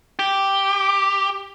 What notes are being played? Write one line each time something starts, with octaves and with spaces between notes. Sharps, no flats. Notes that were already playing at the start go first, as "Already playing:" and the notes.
G4